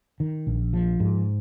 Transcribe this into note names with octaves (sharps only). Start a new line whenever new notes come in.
D#3
A#1
F3
G#2